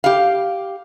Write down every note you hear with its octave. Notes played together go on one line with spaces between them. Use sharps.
G4 F5